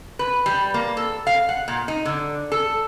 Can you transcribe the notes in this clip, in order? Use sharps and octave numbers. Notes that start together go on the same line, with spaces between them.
B4
G3
A#3
A4
F5
F#5
A#2
D#4
D3
A4